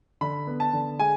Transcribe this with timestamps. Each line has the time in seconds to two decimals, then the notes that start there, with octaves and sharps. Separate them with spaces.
0.21 D3 B5
0.47 B3
0.60 A5
0.73 D3
0.99 G#3 G#5